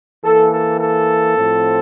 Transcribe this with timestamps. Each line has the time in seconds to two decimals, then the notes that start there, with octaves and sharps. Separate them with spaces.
0.24 E3 A#3 A4
0.53 A4
0.81 A4
1.37 A2 F3 C4